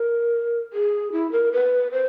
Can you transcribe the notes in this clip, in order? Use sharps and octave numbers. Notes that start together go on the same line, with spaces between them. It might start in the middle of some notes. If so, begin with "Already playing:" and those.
Already playing: A#4
G#4
E4
A#4
B4
C5